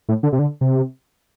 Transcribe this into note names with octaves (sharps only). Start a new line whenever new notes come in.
A2
D3
C3
D3
C3